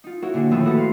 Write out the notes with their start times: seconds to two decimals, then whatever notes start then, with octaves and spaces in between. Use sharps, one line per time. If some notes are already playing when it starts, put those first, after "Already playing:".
0.04 D#4 F4
0.22 E4 F#4 A#4 C#5
0.34 A#2 D3 G4 G#4
0.51 D#2 A2 D#3 F3 B3 E6
0.63 A3 B3 E4 F#4 A4 B4
0.77 F5 C6